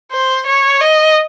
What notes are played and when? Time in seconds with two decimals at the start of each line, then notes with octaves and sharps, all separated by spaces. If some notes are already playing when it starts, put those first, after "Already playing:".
0.12 C5
0.46 C#5
0.81 D#5